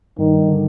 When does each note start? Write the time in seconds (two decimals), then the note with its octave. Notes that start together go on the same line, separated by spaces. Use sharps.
0.19 G2 D#3
0.48 D3